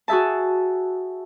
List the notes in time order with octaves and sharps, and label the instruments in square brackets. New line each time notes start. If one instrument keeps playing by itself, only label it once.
[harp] F#4 G#4 E5 A5